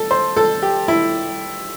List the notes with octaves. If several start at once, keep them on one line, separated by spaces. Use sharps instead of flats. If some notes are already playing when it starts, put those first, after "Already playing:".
Already playing: A4
C5
A4
G4
E4